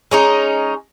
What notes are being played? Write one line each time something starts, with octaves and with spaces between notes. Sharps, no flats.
G#3 C#4 D#4